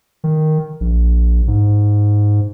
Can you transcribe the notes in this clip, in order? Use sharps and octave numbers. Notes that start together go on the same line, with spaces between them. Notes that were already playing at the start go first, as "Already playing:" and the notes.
D#3
A#1
G#2